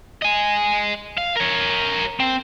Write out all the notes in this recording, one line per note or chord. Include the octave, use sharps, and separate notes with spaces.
D#5 G#5
F5
A#4 C#5
C4